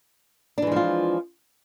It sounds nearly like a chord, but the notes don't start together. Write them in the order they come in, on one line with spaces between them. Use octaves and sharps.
D4 E3 G#3 F3 F4